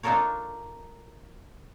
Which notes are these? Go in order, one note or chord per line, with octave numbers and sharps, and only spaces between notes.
D4 D#4 F4 A4 A#4 C#5